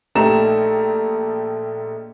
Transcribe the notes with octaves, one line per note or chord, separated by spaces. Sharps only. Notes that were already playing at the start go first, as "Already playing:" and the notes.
A#1 A3 D#4 G4 A#5 E7